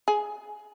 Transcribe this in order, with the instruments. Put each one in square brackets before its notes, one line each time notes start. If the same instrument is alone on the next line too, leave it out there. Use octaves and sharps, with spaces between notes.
[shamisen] G#4